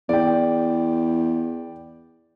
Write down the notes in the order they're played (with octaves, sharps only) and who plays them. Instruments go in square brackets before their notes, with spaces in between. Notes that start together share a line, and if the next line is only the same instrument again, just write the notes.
[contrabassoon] E2 [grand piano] D5 G5